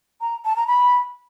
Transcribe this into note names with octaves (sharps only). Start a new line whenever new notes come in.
A#5
A5
A#5
B5